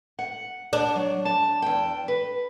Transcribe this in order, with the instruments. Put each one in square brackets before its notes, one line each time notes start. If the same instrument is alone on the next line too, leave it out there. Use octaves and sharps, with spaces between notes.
[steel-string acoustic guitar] F#5
[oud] D4
[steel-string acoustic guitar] F#3
A5
E2 G5
B4